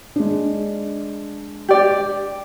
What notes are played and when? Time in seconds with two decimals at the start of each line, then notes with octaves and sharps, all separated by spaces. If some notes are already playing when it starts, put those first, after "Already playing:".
0.16 G#3 D4
1.68 G4 D5